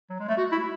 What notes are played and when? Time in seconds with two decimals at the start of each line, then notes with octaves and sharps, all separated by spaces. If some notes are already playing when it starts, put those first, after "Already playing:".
0.10 F#3
0.20 G#3
0.29 A3
0.38 F#4
0.52 E4